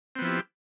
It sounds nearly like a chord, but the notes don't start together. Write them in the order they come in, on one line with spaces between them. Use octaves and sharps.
C4 B3 F3 E4 G4